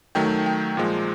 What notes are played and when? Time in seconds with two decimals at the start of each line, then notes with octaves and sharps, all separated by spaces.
0.15 D#3 F#3 A3 G5
0.46 G5
0.77 A#2 F3 G#3